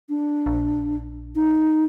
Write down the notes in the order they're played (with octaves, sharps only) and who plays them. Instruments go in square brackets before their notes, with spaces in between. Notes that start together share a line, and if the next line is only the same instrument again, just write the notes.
[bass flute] D4
[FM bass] A#1
[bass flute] D#4